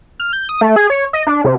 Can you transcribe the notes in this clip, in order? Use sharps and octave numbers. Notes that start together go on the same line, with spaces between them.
F6
G6
D#6
A3
G#4
C#5
D#5
D4
C3